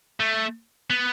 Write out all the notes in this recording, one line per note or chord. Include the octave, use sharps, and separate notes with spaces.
A3
B3